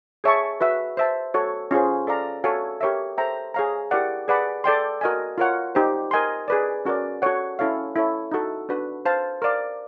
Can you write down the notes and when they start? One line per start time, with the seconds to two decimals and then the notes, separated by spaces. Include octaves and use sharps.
0.24 G#4 C#5 E5 A5 C#6
0.61 F#4 B4 E5
0.97 C5 E5 A5
1.34 F#4 A4 C#5
1.71 C#4 F4 G#4 C5
2.07 A4 D5 F5 A#5
2.44 F#4 A4 C#5 F5 G#5
2.81 G4 A#4 C#5 E5
3.18 A4 C5 E5 G5 A#5
3.54 G#4 C#5 F5 A#5
3.91 E4 G4 A#4 D5 F#5
4.28 G#4 B4 D5 F#5 B5
4.64 A4 D5 G5 C6
5.01 F#4 A#4 D#5 G#5
5.38 F4 A#4 C#5 F#5
5.75 D#4 G4 C5
6.11 A#4 D#5 G#5 C6
6.48 G#4 B4 D5
6.85 C#4 F#4 A#4 D5
7.22 F#4 A4 C#5 F#5
7.59 C#4 E4 A4 C#5 F5
7.96 E4 A4 C#5
8.32 D#4 F#4 A4
8.69 D4 F#4 B4
9.06 C5 F5 A5
9.42 A#4 D5 F5